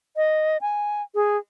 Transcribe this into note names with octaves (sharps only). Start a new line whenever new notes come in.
D#5
G#5
G#4